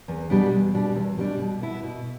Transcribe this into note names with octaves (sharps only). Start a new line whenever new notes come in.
E2
B2 G3 B3 D4
E2
B2 G3 D4
E2
B2 G3 D4
B2
B3 E4
B2